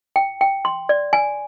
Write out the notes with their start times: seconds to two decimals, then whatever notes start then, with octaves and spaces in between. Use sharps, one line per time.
0.16 G5
0.41 G5
0.65 C6
0.89 D5
1.13 G#5